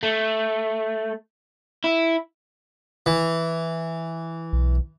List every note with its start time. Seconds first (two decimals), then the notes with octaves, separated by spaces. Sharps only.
0.03 A3
1.84 E4
3.06 E3
4.53 B1